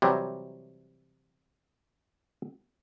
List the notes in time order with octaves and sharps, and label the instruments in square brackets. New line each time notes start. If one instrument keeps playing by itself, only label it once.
[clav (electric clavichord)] C3 E3 F#3 G3